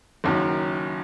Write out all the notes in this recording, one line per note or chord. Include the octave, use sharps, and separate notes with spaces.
F#1 F#2 D#3 F#3